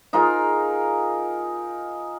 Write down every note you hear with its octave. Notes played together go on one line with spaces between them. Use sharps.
D#4 F4 G#4 A#4